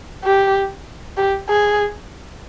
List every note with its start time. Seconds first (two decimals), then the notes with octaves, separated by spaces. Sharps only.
0.24 G4
1.17 G4
1.49 G#4